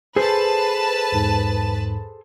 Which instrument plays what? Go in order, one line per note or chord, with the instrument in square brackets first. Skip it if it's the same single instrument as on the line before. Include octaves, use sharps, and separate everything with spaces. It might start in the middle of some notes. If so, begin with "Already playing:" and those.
[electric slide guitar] G#4 A4 C5 [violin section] B4 A5
[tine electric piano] E2 G#2